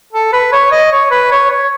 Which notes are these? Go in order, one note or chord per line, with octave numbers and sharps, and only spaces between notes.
A4
B4
C#5
D#5
C#5
B4
C#5
C#5